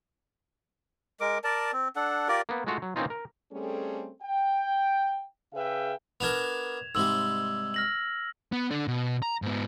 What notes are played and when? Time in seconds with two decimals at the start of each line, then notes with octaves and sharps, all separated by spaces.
1.20 G#3 A#4 D6
1.44 A#4 D5 A5
1.73 C4
1.96 D4 A4 F#5
2.29 F4 G4 A#4 D5
2.49 A#3 B3
2.67 G#3 A3 F4 F#4 F5
2.82 F#3
2.96 E3 A#3 C4 C#4 D#4 F4
3.10 A#4
3.51 G3 A3 C4 C#4 G#4 A4
4.23 G5
5.53 C#3 G#4 B4 E5 F5 G5
6.20 B3 D4 A#4 G#6 E7 F7
6.95 G#2 C3 G3 E6 F#7
7.74 F6 A#6 F#7
8.52 B3
8.71 D4 A4
8.88 B2
9.22 A#5
9.42 G#2 B3